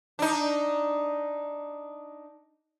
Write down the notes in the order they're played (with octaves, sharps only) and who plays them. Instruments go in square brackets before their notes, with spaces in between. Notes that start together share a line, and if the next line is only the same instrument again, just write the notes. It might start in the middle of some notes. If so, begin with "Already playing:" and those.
[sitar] D4 D#4